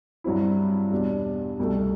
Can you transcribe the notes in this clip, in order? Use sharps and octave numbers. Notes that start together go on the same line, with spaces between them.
G2 F#3 C4 E4
E2 B2 G3 D4
C2 B2 A3